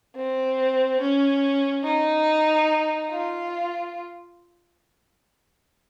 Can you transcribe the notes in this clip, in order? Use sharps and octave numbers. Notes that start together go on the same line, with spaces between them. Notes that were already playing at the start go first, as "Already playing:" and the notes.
C4
C#4
D#4
F4